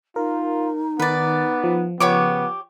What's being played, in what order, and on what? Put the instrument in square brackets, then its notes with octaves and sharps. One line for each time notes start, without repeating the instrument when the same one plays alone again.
[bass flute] D#4 [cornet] F4 [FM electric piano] A#4
[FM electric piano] D#3 A6 [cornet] B3 [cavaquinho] B4 D5
[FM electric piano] F3
[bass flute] C#3 [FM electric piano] F3 [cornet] B3 [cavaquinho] G4 C#5 D6